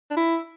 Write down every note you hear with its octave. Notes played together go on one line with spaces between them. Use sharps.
D4
E4